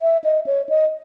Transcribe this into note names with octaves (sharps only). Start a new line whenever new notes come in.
E5
D#5
C#5
D#5